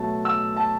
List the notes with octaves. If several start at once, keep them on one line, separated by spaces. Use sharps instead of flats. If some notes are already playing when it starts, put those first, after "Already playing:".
Already playing: B2 F#3 A3 A5
E6
A5